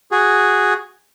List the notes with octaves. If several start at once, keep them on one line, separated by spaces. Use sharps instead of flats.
F#4 G#4